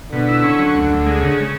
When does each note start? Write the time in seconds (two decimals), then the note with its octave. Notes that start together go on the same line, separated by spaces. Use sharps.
0.12 B2 D3
0.28 E4
0.44 C#4
0.59 F#3
0.75 D2
0.90 D2
1.06 G#3
1.21 C#3